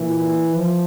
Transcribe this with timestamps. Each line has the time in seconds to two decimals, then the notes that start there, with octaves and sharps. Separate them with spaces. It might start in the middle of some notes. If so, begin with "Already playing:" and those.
Already playing: A#2 E3
0.55 F3